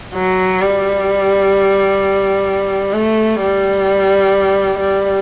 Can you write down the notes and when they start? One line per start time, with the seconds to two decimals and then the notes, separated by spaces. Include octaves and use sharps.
0.15 F#3
0.61 G3
2.93 A3
3.40 G3
4.79 G3